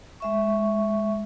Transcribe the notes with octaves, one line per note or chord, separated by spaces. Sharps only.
G#3 E5 C#6